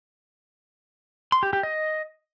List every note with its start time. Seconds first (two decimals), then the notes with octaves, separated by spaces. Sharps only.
1.32 C6
1.43 G4
1.53 G4
1.63 D#5